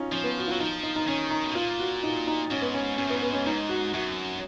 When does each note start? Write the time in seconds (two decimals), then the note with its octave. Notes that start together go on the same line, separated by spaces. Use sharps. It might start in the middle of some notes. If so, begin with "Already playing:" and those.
Already playing: C#4 D#4 F4
0.12 F3 C#4
0.24 B3
0.38 F#4
0.48 F4
0.51 F#3
0.60 F3 D#4
0.83 D#4
0.96 D#4
1.07 D#3 C#4
1.31 D#4
1.44 B2
1.55 A#2 F4
1.79 F#4
2.03 D#4
2.27 D#4
2.51 G#2 C#4
2.62 B3
2.74 C#4
2.98 G#2 C#4
3.07 F#2 B3
3.16 G#2
3.22 B3
3.33 C#4
3.46 G#2 D#4
3.69 F#4
3.93 F#2 F#4